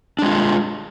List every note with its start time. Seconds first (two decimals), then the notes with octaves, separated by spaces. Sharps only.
0.19 D4
0.22 G#3
0.26 F4